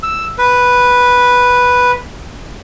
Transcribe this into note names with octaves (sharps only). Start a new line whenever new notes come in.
E6
B4